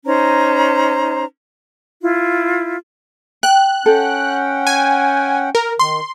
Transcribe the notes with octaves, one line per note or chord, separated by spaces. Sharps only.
C#4 D#4 C5 A#5
E4 F4
G5 F#6
C#4 A4 F#5 G5
G#5
A#4
D#3 C6